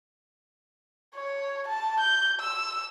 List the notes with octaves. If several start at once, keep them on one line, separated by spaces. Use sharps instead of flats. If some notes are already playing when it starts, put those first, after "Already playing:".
C#5
A5
G6
E6